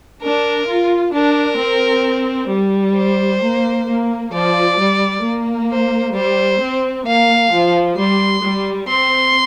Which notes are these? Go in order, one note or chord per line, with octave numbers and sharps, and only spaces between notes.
D4 A#4
F4
D4 A#4
C4
G3
C5
A#3
A#3
F3 D5
G3
A#3
C5
G3 C5
C4
A#3 F5
F3
G3 C6
G3
C4 C6